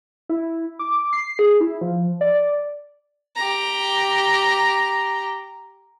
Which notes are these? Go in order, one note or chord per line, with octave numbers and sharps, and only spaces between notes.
E4
D6
C7
G#4
E4
F3
D5
G4 A#5